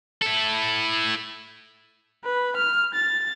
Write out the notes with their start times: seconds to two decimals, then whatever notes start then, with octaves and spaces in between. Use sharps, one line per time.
0.22 E4 A4
2.24 B4
2.56 F6
2.94 A6